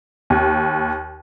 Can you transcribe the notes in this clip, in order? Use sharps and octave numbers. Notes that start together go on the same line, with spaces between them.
D#2